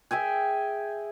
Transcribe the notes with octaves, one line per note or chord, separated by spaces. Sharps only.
G#4 E5 G5 G#5